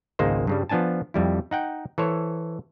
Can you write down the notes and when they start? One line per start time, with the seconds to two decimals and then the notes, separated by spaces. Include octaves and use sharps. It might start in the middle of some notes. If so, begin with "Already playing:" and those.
0.19 G#1 C#2 G#3 A#3 D#4 C5
0.47 G2 C#3 G3
0.69 F3 B3 D4 G#5 A5
1.14 F2 G3 E4
1.51 D#4 F#5 G5
1.98 E3 A4 C5 C#5